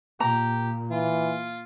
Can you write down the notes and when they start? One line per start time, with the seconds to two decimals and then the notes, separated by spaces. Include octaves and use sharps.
0.20 A#2 G4 A#5
0.91 E3 F4